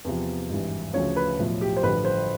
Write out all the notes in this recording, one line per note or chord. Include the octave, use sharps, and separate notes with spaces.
E2 C3 F3
G#1 G2 E3
D2 C#3 F3 C#5
B4
B1 A2 F3
G4
C5
A1 G2 D3 F3 B4
C5